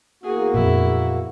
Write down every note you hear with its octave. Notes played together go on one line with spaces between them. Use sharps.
E2 A#3 F#4 G#4
F2 A#2 E4